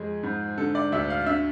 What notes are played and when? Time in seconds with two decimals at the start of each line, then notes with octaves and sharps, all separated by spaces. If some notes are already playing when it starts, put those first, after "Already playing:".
Already playing: F2 G#3 G#4
0.23 G#2
0.57 D3 A4
0.75 D5
0.92 D2 E5
1.10 F5
1.26 D3 E5